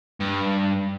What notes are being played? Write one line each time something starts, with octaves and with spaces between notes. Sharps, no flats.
G2